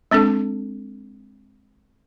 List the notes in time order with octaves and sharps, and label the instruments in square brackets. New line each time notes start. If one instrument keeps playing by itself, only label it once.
[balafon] G#3 C4 D4 A4